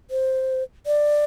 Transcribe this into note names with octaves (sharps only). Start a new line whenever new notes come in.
C5
D5